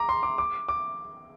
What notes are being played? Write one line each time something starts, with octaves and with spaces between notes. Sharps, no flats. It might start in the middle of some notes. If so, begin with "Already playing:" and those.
Already playing: A#5 D6
C6
D6
D6
D6